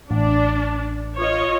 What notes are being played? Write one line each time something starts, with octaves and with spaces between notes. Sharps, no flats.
A1 D4
F4 C#5 D#5